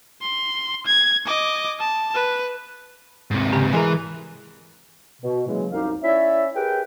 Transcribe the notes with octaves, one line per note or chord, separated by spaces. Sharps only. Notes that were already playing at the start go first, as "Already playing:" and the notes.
C6
G#6
D#5 D6
A5
B4
G#2 C3
C#3 G4 A#5
E3 G#3 G#4 A#4
B2
C#3 E3 F#3 G#3 A#3
C2 F#2 D#4 G4 F5
C#4 E4 C#5 D5 E5
G4 G#4 A#4 B4 G5